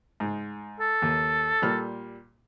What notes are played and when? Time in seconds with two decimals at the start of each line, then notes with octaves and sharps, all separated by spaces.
0.20 G#2
0.80 A4
1.02 D#2
1.62 A#2 G3 F6